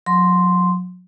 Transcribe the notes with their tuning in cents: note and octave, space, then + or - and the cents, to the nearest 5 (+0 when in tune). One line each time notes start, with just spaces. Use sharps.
F#3 -35 C6 +0